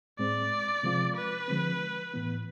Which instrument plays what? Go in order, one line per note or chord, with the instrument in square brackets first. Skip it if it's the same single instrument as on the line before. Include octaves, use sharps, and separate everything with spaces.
[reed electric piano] A2 G#3 C4 [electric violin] D5
[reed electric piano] C3 F3 G#3 C4 F4
[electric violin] B4
[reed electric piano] D3 F3 G#3 C4
A2 E3 B3